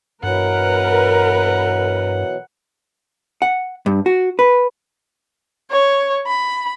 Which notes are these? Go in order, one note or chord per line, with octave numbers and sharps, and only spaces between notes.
G2 B2 E3 F#3 A#4 B4 F#5
F#5
G2
F#4
B4
C#5
B5